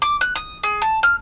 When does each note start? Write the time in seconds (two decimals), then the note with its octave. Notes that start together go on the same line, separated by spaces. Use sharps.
0.02 D6
0.21 F#6
0.35 D#6
0.64 G#4
0.82 A5
1.03 F6